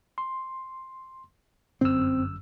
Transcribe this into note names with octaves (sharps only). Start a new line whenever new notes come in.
C6
G1 F#2 C4 E6